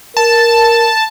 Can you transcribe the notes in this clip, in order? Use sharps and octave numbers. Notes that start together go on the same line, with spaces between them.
A#4 A5